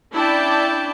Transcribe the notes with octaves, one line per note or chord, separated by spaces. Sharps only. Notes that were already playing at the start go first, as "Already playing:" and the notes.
C#4 D4 E4 D5 G5 A5